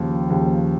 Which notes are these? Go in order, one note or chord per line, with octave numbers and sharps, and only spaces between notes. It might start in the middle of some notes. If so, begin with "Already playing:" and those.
Already playing: D#2 C#3 F3
D#2 C#3 F3